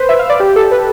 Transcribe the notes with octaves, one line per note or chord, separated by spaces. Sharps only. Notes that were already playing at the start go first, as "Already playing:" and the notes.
Already playing: B4 C5
E5
F5
D5
G4
A4
B4